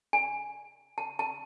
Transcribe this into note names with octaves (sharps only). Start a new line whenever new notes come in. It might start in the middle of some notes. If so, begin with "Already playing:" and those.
G#5
A5
A5